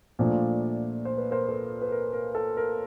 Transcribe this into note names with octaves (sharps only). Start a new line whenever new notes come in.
A#2 F3 A3 D4
C5
B4
A#4 C5
A4 B4
B4
A#4
A#4
A4
A#4